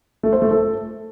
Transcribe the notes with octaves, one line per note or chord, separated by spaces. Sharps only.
A3
C5
A3
A4